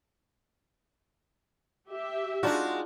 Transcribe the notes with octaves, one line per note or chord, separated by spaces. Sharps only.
G4 E5
G#3 D4 D#4 F4 F#4